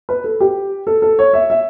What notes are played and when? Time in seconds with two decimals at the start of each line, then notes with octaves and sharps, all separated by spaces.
0.09 B4
0.24 A4
0.40 G4
0.87 A4
1.02 A4
1.19 C#5
1.33 E5
1.50 E5